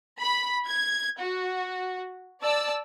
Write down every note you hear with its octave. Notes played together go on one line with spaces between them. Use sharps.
B5
G#6
F#4
D5 A5 E6